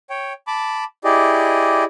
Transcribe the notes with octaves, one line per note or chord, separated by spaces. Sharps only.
C#5 G5
A5 B5 D6
E4 G4 G#4 D5 D#5